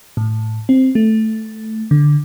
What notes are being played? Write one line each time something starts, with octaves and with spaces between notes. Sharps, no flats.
A2
C4
A3
D3